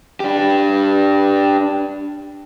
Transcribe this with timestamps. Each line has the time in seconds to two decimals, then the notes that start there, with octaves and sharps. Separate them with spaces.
0.20 D4 G4